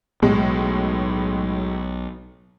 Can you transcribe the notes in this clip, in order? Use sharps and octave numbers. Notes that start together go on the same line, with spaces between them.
B1 A2 G#3